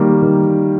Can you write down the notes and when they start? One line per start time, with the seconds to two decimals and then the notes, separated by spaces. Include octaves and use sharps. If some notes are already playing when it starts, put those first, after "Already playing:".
Already playing: D#3 G3 A#3
0.22 D#3